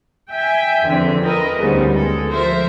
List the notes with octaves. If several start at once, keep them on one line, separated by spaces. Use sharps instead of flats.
E5 G5 G#5
E2 D3 F3 C4
F4 A#4 B4 D#5
D2 G#2 C#3 G3 B3
G#3 A4
F3 A#4 C5 E5